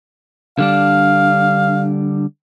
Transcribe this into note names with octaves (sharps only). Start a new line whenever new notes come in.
D3 G3 D4 F5